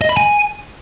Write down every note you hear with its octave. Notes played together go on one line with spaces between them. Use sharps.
D#5
B5
G#5